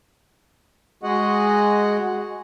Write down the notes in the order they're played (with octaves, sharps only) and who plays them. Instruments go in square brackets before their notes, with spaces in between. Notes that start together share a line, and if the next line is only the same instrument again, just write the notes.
[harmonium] G#3 F#4 G#4 D#5 F#5